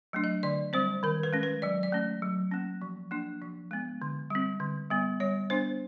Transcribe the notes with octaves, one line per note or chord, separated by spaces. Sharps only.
F#3 A3 D4
D#5
D3 D5
G3 C4 C5
D#3 A#4
B4
G#3 C#4
B4
F#3 D5
D5
A3 C#4
F#3
A#3 C#4
F3
A#3 D4
F3
G#3 B3
D3
G3 C4
D3
G3 B3
G3 C#5
B3 D4 C5